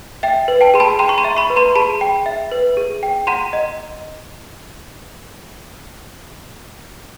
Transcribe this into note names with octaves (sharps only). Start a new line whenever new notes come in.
E5 G5
B4
G5 A5
G#4 C6
A5 B5
G5 A#5 C6
C#6
A#5 C6
E5
B5 C#6
B4
A#5 C6
G#4 A5 B5
G5
E5
B4
G#4
G5
F#5 A#5 C6
D#5